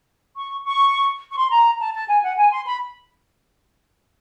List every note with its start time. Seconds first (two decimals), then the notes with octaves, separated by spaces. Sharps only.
0.36 C#6
0.64 C#6
1.32 C#6
1.36 C6
1.51 A#5
1.79 A5
1.94 A5
2.08 G#5
2.22 F#5
2.37 G#5
2.51 C6
2.65 B5